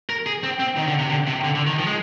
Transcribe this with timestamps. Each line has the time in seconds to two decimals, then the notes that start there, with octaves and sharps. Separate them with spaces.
0.09 A#4
0.27 G#4
0.43 C4
0.60 C4
0.77 D#3
0.88 D3
0.99 C3
1.10 D3
1.27 C3
1.44 D3
1.55 D3
1.67 D#3
1.79 F3
1.87 G#3